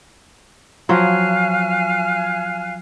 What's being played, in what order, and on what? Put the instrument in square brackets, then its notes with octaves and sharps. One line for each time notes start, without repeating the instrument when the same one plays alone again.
[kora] F3 F#3 [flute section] F5 G#5 F#6